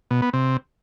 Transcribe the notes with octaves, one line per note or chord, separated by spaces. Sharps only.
B2
B3
C3